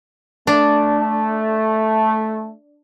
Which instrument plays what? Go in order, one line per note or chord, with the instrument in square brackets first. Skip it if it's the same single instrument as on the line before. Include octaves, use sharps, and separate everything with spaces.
[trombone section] A3 [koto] D4